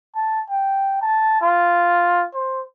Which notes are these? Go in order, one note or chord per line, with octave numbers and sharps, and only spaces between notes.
A5
G5
A5
F4
C5